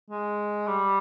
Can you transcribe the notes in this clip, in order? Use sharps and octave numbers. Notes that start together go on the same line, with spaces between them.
G#3
G3